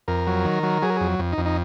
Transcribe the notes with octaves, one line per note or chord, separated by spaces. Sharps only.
F2 A#4
F#3
D#3
F#3
F#3 G#4
A#4
F2 G#4
F2
D#4
F2
D#4